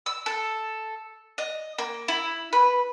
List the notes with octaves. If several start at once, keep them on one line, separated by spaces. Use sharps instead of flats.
E6
A4
D#5
A#3
E4
B4